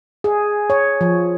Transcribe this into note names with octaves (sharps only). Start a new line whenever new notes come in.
G#4
C#5
F3